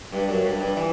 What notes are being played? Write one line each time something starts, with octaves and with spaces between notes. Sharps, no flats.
G2
F#2
G2
G2
E3